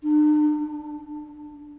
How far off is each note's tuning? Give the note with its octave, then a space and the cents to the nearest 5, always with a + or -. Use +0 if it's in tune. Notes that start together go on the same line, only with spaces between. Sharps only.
D4 +45
D4 +5